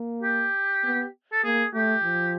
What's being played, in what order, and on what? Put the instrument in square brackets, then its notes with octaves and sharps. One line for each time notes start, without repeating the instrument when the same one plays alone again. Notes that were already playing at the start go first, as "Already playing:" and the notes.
Already playing: [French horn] A#3
[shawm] G4
[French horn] B3
[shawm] A4
[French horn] A#3 [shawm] G#4
[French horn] A3 [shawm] G4
[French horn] F3